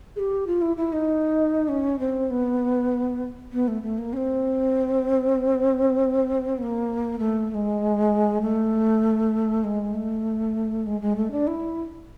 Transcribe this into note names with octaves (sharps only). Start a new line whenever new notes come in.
G#4
G4
F4
E4
E4
D#4
C#4
C4
B3
B3
A3
A3
A#3
C#4
C4
B3
A#3
A3
A3
G#3
A3
G#3
A3
G#3
G#3
A3
D4
E4